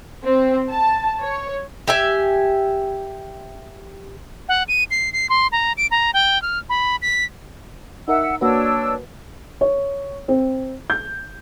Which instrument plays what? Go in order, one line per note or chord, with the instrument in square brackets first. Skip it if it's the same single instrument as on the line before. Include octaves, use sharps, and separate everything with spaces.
[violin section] C4
A5
C#5
[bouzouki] G4 E5 G#5
[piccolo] F#5
D#7
C7
C7
C6
A#5
D7
A#5
G5
F6
B5
B6
[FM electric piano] D#4 A#4 [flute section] E5 F#5 E6
[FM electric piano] A#3 F#4 B4 [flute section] D4 C#5 E6
[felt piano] C#5
C4
G6